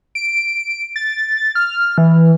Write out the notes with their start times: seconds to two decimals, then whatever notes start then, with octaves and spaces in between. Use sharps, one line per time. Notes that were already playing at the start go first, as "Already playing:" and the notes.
0.15 D7
0.96 A6
1.55 F6
1.98 E3